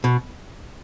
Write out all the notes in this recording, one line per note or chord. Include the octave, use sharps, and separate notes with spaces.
B2